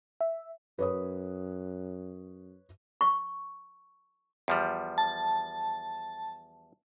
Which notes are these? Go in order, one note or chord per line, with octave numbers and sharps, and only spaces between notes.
E5
F#2 B4 C#5 D#6
C#6
E2 F3 G3
A5